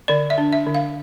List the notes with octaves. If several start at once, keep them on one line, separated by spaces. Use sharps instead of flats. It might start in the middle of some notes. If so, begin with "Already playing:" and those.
D3 D5
E5
D4
E5
D3
F5